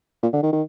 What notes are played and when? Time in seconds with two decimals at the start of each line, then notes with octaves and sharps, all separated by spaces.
0.23 A#2
0.33 D3
0.43 D#3
0.53 D#3